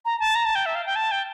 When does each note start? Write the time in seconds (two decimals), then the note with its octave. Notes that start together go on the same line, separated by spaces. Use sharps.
0.05 A#5
0.20 A5
0.35 A#5
0.45 A5
0.55 G5
0.66 E5
0.75 F5
0.86 G5
0.96 A5
1.11 G5